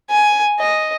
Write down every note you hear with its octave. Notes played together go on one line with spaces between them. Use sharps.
G#5
D#5